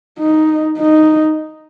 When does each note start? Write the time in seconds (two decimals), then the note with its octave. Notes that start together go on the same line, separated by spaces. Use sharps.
0.19 D#4
0.78 D#4